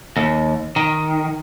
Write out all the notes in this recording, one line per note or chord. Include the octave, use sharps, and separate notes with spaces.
D#2
D#3